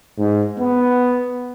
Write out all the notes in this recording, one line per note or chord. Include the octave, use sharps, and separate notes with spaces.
G#2
B3